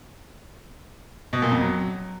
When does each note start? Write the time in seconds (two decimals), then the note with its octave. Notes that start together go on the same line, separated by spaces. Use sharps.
1.33 B2
1.42 A#2
1.51 F2
1.61 F#3